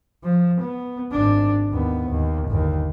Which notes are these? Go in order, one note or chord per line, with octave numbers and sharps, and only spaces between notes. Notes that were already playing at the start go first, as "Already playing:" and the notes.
F3
B3
G#1 D4
D#2 B3
D#2
G1 D#2